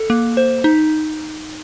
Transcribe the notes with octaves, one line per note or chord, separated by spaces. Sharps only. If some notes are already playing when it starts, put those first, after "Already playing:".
Already playing: A4
A#3
C5
D#4